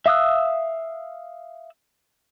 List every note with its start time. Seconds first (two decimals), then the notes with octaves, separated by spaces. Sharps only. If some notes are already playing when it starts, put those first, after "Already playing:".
0.06 E5 F5 D#6 E6 F#6